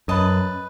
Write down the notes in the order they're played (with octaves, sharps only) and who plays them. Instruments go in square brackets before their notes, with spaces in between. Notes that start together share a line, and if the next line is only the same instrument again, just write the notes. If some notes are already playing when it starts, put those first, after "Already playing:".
[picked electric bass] F#2 [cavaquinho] B4 D#5 A5